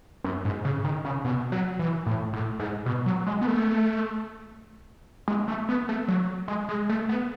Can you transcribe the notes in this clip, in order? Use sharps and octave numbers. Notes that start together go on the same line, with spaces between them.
F#2
G#2
C#3
D#3
C#3
B2
F#3
E3
A2
A2
G#2
B2
F#3
G#3
B3
A3
G#3
A3
B3
A3
F#3
G#3
G#3
A3
B3